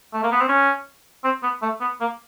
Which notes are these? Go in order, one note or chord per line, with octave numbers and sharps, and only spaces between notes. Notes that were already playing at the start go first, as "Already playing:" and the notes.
A3
A#3
B3
C4
C#4
C4
B3
A3
B3
A#3